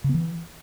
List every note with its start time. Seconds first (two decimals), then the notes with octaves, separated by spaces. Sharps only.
0.04 C#3
0.09 B3
0.14 E3